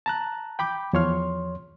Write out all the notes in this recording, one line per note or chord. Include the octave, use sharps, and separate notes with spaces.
A5 A#5 F#6
G5 B5 D6 G6
E2 F3 C#5 C6 F6